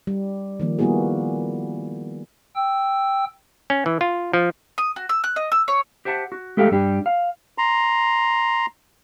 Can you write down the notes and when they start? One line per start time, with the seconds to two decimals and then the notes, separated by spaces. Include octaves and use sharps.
0.07 G3
0.60 D#3 F3 A#3
0.79 G3 A#3 B3 E4 F#4 G#4
2.56 G5 E6
3.70 C#4
3.86 E3
4.01 F4
4.33 F3
4.78 D#6
4.96 F#4
5.09 E6
5.24 F#6
5.36 D#5
5.52 E6
5.68 C#5
6.05 G4 C5 E5 F#5 A5
6.32 F#4
6.57 G#3 A3 G4 A4 E5 F5
6.71 G2 G3 D4 G4
7.06 F5
7.58 A#5 C6